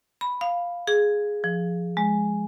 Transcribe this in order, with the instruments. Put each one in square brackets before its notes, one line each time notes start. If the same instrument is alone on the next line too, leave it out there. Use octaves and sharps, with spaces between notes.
[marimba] B5
F5
G#4
F3
G#3